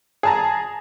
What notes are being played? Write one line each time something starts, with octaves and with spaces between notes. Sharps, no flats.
G#4 A5 A#5